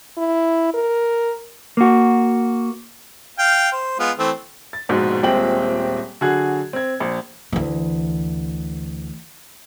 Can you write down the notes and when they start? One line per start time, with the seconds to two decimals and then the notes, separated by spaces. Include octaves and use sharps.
0.17 E4
0.74 A#4
1.77 A#3 F#4
3.39 F5 G5
3.72 C5
3.99 G#3 B3 F4
4.18 E3 A3 C4
4.73 A6
4.89 A#1 G#2 B2
5.22 D#1 A#2 G#3 C4 G5 F#7
6.21 D3 F#3 F#4 G#4 F#6 G#6
6.73 C4 G#6
7.00 A#1
7.52 D2 E3